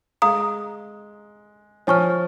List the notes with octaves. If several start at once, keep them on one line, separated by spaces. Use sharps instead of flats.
G#3 F5 A#5 D#6
F3 C#5 G#5 C#6 F6